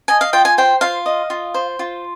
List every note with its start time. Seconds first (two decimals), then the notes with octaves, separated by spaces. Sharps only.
0.08 D#5 G#5
0.21 F5
0.33 F4 G5
0.45 G#5
0.58 C5 G5
0.81 F4 F5
1.06 D#5
1.30 F4
1.54 C5
1.79 F4